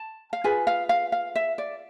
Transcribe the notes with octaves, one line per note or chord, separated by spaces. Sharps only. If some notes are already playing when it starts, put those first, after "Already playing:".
Already playing: A5
F5
F4 G#4 B4 G#5
F5
F5
F5
E5
D5